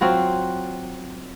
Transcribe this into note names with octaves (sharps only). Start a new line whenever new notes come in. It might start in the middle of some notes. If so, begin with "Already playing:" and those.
F#3 C4 F4 F#4